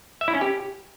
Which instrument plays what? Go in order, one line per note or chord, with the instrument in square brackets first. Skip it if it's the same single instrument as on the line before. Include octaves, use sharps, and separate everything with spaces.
[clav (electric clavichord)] E5
E4
C#4
G4